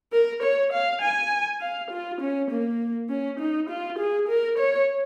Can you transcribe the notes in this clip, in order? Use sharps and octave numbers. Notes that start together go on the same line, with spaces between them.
A#4
C#5
F5
G#5
F5
F4
C#4
A#3
C#4
D#4
F4
G#4
A#4
C#5